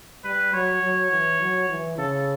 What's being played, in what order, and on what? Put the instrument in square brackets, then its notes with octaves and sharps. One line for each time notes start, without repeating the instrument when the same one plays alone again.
[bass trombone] G3 [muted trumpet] B4
[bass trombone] F#3 [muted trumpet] C#5
[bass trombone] F#3
E3
F#3
E3
[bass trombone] C#3 [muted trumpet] A4